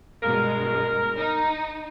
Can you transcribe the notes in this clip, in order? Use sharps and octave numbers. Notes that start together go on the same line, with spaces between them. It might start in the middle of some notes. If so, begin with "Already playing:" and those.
G2 B2 G#3 A#4
D#4